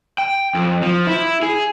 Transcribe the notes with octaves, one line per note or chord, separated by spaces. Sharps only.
G5
F2
F3
E4
G#4